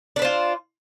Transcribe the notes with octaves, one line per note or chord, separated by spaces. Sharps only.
D4 F4 B4 C5